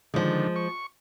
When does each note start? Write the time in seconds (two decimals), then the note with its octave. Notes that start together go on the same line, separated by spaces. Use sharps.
0.14 D3 D#3 F3 G#3
0.56 C#6